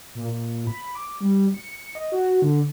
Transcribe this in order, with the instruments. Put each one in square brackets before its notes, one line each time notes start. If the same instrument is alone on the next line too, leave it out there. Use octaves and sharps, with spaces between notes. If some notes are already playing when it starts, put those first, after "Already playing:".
[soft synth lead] A#2
A#2
B5
D6
G3
C#7
D#5
F#4
D3